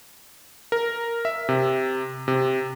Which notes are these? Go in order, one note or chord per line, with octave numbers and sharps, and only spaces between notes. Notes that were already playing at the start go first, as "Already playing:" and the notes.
A#4
E5
C3
C3